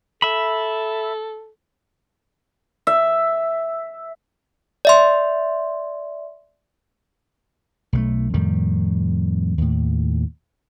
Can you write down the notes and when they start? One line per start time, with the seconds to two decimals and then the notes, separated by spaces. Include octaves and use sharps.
0.22 A4 E5 B5
2.87 E5
4.85 D5 E5 C6
7.93 B1 G3 A3
8.34 F2 A2 D#3 G3
9.58 D#2 A2